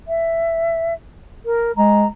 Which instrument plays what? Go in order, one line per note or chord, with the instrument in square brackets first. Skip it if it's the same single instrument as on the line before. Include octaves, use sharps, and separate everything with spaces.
[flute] E5
A#4
[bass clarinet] G#3 [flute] A#5